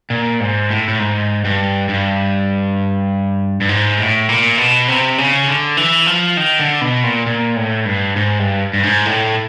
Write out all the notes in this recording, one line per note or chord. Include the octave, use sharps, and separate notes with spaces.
A#2
G#2
A2
A2
G#2
G2
G2
G2
G#2
A2
A#2
B2
C3
C#3
D3
E3
F3
D#3
D3
B2
A#2
A#2
A2
G2
G#2
G2
G2
G#2
A2